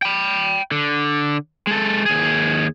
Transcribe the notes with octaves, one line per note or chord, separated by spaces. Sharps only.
G5 B5
D3
G#3 A4
D#2 G#4